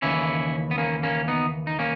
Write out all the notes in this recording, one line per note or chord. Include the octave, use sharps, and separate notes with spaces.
D#2 C#3 E3 C#4 E4
B3
A#3 C#4
A#3 C#4
B3 D#4
D#4
A#3 C#4